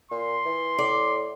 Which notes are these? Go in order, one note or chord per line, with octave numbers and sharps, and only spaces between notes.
A#2 C6
E3
A2 D5